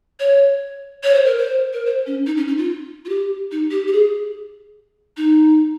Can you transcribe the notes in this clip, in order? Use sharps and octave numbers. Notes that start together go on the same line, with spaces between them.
C#5
C#5
C5
A#4
C5
A#4
C5
C#4
D#4
C#4
D#4
F4
F4
G4
D#4
G4
G4
G#4
D#4